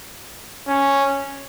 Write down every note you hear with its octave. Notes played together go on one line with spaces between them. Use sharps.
C#4